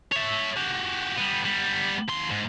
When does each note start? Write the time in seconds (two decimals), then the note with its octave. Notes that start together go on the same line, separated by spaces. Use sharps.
0.12 C#5 E5
0.57 F#4 G4
1.18 G3 B3
1.46 G3 B3
2.09 D#2 C6
2.31 G#2